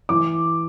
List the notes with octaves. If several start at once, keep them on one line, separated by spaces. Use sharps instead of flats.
E3 D6